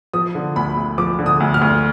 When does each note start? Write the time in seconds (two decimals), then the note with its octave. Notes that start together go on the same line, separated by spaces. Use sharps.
0.14 F3 D#6
0.35 D3
0.56 D2 B5
0.77 D2
0.98 F3 D6
1.19 D3
1.26 D#6
1.40 D2
1.54 F6
1.61 D2